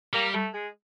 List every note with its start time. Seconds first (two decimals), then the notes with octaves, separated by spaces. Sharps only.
0.13 G3 A#3 A#4
0.34 A3 A4
0.54 G#3 G#4